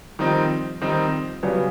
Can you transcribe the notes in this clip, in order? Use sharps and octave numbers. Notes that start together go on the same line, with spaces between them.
D#3 F3 G3 C4 D#4
D#3 G3 C4 D#4
C#3 F#3 G3 B3